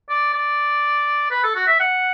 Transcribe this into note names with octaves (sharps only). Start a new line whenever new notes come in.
D5
D5
B4
A4
F#4
E5
F#5